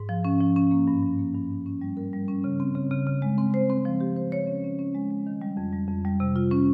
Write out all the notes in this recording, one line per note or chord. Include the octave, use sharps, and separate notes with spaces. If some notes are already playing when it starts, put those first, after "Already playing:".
Already playing: G#2
F3
C#4
F3
C#4
A#3
G2
G2
A#3
G2
C#4
C#4
G3
A#4
G3
C#4
C#3
C4
C#3
C#3
C#3
G#3
C4
C5
C4
F3
G4
C5
C#5
C#4
C#4
C#4
G#3
G#3
D#3
G3
F2
G3
F2
G3
C3
F4
C#4